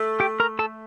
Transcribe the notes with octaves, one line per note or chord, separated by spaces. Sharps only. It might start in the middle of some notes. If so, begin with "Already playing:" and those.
Already playing: A3
G4 G5
A#4 A#5
A4 A5